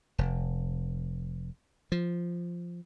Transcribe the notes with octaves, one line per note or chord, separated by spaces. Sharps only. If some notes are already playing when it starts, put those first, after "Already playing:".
F1
F3